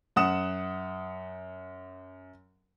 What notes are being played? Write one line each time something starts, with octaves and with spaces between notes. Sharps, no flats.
F#2 F#5 D#6 E7